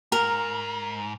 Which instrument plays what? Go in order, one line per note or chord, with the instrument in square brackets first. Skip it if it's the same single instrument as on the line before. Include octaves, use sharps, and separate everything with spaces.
[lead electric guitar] G#2 [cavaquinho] A#4